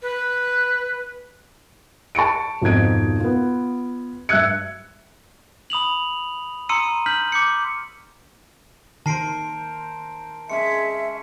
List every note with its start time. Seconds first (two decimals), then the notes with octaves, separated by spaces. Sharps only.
0.02 B4
2.15 A5 C#6 C#7 D7
2.61 G#1 F2 B2 D#4 G#6 D7
3.20 B3 F4
4.29 G2 E5 E6 F#6 G#6 C#7
5.70 B5 D#6 F7 F#7
6.69 A#5 C6 D#6 E6 C#7 D#7
7.06 F6 G6 B6 F#7
7.32 D6 G6 C#7
9.06 D#3 A#4 C5 A5 C7 D7
10.49 G#3 C#4 G#4 E5 C#7